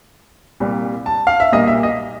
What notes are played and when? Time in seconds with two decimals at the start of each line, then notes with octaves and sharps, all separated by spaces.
0.60 C2 A#2 G3
1.06 A5
1.27 F5
1.40 E5
1.52 B1 A#2 G3 A#3 D#5
1.68 E5
1.83 D#5